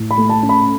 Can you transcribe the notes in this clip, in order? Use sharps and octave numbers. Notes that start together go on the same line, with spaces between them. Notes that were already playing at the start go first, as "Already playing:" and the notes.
Already playing: A2
B5
A3
A5
C#4
B5